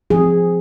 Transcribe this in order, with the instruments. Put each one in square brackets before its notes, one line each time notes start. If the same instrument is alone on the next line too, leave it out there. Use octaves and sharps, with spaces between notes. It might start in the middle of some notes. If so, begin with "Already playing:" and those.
[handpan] F3 C4 G#4